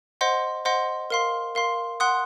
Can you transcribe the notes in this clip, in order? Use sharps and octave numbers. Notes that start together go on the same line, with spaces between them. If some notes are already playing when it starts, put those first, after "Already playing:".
C5 D#5 F#5 C6
C5 D#5 F#5 C6
A#4 F5 C6
A#4 F5 C6
F#5 C6 D#6 F#6